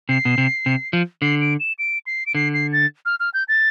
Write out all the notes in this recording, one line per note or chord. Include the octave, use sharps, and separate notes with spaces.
C3 C7
B2
C3
C3
F3
D3 C7
D7
E7
D7
C7
D7
D3 C7
C7
A6
F6
F6
G6
A6